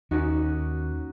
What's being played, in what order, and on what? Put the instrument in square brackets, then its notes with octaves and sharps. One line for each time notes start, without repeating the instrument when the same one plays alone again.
[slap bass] D#2 [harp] C#4 D#4 F#4